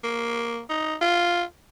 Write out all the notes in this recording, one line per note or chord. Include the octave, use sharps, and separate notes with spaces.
A#3
D#4
F4